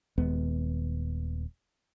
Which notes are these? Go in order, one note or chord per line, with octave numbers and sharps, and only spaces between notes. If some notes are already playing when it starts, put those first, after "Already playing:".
D#1 D#2 G#3 B3